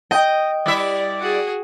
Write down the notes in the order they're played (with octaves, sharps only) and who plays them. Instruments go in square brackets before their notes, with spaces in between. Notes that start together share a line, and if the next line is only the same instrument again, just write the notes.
[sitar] D#5 [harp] G5
[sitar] G3 E4 E5 [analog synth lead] D5
[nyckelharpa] F#4 G#4